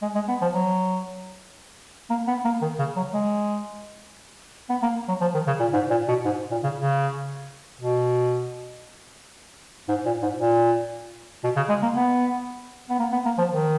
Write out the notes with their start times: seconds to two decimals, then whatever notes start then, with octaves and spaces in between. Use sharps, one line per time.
0.02 G#3
0.15 G#3
0.29 B3
0.42 F3
0.54 F#3
2.10 A#3
2.27 B3
2.45 A#3
2.62 D#3
2.79 C#3
2.96 F#3
3.14 G#3
4.70 B3
4.82 A#3
5.09 F#3
5.21 F3
5.34 D#3
5.47 C#3
5.60 A#2
5.74 G#2
5.90 A#2
6.08 B2
6.25 G#2
6.51 A#2
6.64 C#3
6.77 C#3
7.81 B2
9.89 G#2
10.06 A#2
10.23 G#2
10.40 A#2
11.44 B2
11.57 C#3
11.69 G#3
11.83 A#3
11.95 B3
12.90 B3
12.99 A#3
13.12 B3
13.25 A#3
13.38 F3
13.52 D#3